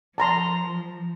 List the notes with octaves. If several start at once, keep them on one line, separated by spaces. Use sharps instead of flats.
F3 A5 A#5 C6